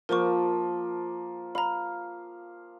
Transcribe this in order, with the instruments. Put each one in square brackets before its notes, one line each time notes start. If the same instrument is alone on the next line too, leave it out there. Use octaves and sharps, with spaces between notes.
[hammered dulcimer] F3 A#3 [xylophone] A#4 C5 C#6
[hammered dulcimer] F5 [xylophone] A#5 B5